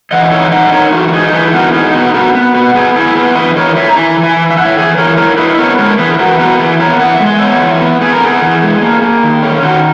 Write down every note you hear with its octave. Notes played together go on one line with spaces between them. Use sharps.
E3 D#5 F#5
F#5
D#4 C#5 E5
D#4 D#5 F#5
D#5
D#4 A#4 C#5
E3 F#4
F#4
D#4 G#4
E3 G#4 B4
G#4
B3 F#4 A#4
D#4 G#4
B3 F#4
B4
B3 F#4 A#4
B3
B3 F#4
B3 G#4
E4 G#4
B3 G#4 B4
E3 B4 D#5
E3 A#4 C#5
E4 C#5 E5
A#5
E4 E5 G#5
E3
E5 G#5
E3
E5
E4 F#5
C#5 E5
E3 G#4
E3 A#4 C#5
E4 A#4 C#5
E4 B4 D#5
B3 A#4 C#5
G#3 A#4 C#5
E3 G#4 B4
B4
E3 F#4 A#4
B4
B3 F#4 A#4
E3 G#4 B4
B3 A#4 C#5
E3 F#5
E5
G#3
D#5
B3 C#5 E5
E3
B3
B3 G#4
A#4
B3 G#4
E3
G#3
A#3
A#3
D#3
C#4
D#3 F#4